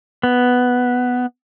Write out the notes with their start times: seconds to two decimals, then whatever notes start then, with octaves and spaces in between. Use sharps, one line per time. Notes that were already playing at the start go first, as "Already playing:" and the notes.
0.23 B3